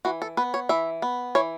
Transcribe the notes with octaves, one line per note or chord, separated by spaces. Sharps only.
E3 F#4
A4
B3 B4
C#5
E3 E5
B3
E3 C#5